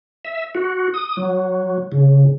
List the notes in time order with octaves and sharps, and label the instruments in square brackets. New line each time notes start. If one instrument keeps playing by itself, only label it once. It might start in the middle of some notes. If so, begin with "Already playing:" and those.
[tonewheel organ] E5
F#4
D#6
F#3
C#3